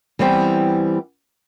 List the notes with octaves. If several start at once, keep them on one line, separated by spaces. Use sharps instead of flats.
E3 G3 B3 C4